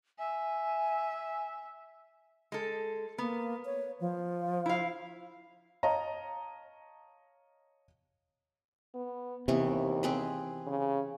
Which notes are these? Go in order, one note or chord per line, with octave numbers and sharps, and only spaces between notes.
E5 G#5
G#3 A4
A#3 B3
C#5
F3
E4 F5
C#5 D#5 F5 A5 A#5
B3
D#2 C3 E3 B3 C#6
C4 G#4 B4
C#3